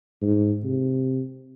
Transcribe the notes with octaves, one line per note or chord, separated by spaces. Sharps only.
G#2
C3